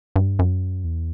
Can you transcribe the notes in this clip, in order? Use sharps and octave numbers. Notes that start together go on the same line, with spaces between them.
G2
F#2
E2